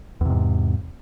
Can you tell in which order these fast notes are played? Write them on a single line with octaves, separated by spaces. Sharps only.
E2 C3 G#2